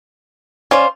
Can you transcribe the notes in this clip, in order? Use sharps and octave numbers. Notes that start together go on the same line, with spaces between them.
C#4 F4 C5 D5